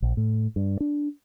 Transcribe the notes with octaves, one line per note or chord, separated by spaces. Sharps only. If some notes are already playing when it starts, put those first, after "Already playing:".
A#1
A2
G2
D4